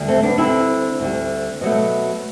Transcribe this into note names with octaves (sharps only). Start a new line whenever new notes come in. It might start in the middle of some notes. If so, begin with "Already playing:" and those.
Already playing: D2 D3 G3
A3 C4
B3 D4
D2 D3 G3 C4 E4
D2 D3 G3
B2 F#3 A3